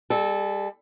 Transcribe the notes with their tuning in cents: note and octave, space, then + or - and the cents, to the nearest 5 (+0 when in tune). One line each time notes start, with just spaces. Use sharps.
G3 +30 A4 -20